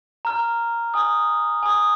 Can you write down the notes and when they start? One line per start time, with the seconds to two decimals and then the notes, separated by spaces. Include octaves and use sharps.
0.25 A#5 F6
0.94 G#5 D#6
1.63 G#5 D#6